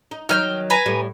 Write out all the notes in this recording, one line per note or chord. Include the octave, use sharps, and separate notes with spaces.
D#4
D#3 F#3 D#4 G5 G#5 F6
B4 G#5 A#5
A2 G3